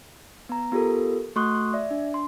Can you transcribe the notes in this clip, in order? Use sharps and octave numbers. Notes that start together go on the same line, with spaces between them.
B3 A#5
B3 F4 G4 A4 A#4
A3 F#4 C6 C#6 D#6 F#6
D5 E5
D4
C6